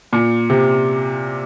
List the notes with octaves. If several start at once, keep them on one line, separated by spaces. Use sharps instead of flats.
A#2
C3